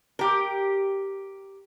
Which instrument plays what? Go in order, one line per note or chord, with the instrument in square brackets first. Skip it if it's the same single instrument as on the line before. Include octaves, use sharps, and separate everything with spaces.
[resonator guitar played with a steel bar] G4 A#4